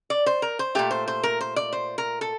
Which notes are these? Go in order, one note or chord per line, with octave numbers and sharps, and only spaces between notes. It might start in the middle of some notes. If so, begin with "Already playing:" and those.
D5
C5
A#4
C5
A#2 A3 G4
C5
C5
A#4
C5
D5
C5
A#4
A4